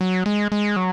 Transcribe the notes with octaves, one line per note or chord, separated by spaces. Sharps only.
F#3
G#3
G#3
F#3